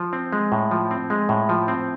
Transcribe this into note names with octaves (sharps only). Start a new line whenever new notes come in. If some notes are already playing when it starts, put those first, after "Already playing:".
Already playing: F3
C4
G#3
A2
F3
C4
G#3
A2
F3
C4